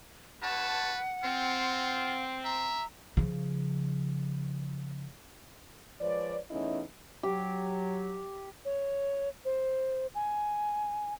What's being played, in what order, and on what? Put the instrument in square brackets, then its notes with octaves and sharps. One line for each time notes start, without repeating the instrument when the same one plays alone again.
[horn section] G2 C#5 A5 [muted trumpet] B4 [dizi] F#5
[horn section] C4 [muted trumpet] F4
[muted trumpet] E5 [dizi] A#5
[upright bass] C#3 F3
[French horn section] F3 G#3 B4 C#5 D5
E2 A3 C#4 D#4 E4 D#5
[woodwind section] F#3 [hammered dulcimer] G4
[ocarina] C#5
C5
G#5